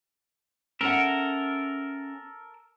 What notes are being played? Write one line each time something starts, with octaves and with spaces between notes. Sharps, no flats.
C#4 A4 A#4 E5 F#5